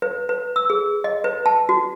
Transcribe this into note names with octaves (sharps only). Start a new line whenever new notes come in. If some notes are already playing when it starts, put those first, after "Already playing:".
B4
B4
E6
G#4
D#5
B4
A5
F#4